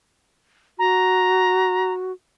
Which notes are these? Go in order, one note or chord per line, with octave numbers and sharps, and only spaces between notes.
F#4 A#5